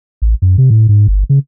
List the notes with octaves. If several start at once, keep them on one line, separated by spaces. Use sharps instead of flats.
A1
F#2
C3
A2
G#2
G1
C#3